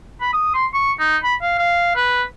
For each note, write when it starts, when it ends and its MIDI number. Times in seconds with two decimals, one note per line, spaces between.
0.21 0.29 83
0.33 0.51 87
0.54 0.66 84
0.74 0.92 85
0.99 1.17 63
1.23 1.35 83
1.42 1.54 77
1.58 1.95 77
1.96 2.23 71